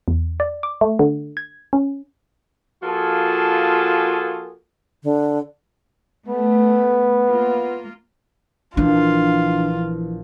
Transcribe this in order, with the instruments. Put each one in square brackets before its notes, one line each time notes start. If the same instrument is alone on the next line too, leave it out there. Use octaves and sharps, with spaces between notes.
[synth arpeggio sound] E2
D5
D6
A3
D3
G#6
C#4
[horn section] F3 A#3 F4 F#4 G#4 A4
[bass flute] D3
[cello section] A3 [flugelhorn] B3
[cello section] A#3 F4
[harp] A#1 [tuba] E3 [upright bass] D4 [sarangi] F4